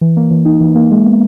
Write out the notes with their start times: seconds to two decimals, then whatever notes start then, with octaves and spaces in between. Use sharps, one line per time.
0.01 E3
0.17 A#3
0.31 E3
0.45 D#4
0.60 E3
0.75 A#3
0.91 G#3
1.05 B3